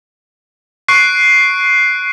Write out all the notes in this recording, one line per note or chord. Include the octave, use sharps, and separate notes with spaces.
C#6 F#6 C7 D7